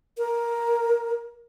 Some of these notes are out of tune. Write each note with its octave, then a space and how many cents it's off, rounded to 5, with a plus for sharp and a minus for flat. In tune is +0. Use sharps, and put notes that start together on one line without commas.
A#4 +10